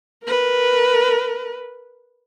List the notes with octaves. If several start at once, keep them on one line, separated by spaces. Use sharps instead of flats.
A#4 B4